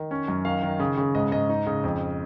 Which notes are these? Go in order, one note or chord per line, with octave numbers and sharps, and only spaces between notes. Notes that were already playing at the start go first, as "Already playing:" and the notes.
Already playing: D#3
C#4
F#2
D#3 F5
D#3
C#3
C#3
G#2 D#5
G#2 D#5
D#4
C#3
F2